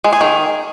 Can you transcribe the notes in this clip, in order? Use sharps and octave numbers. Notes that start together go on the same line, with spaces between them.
G#3
G#4
D#3